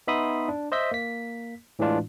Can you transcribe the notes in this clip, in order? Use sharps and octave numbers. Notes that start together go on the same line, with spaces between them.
B3 D#4 E5 B5 C6 D#6
D4
C5 D#5 E5 G6 B6
A#3 B6
A2 E3 G#3 D4 F4